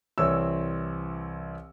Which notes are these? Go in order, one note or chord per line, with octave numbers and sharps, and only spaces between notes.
C2 E3 C4 C#5 E6